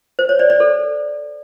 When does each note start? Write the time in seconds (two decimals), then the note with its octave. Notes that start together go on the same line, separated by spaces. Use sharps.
0.19 C5
0.29 C#5
0.39 D5
0.50 D5
0.60 A4